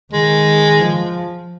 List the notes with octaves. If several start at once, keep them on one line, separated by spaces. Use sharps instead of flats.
D#3 G#3
F3